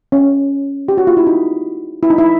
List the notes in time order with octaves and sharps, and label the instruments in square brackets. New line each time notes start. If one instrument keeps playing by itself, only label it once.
[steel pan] C#4
G4
F#4
F4
E4
D#4
E4
D#4
E4